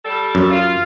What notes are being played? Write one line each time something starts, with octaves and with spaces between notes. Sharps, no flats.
G3 A4
F#2
F4